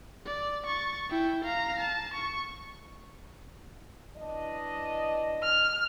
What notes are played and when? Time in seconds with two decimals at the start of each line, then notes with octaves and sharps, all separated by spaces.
0.26 D5
0.66 C#6 A6
1.10 E4 G5
1.45 F5 A#5
1.80 A5
2.14 C#6
4.17 E3 D4 D#5
5.43 F6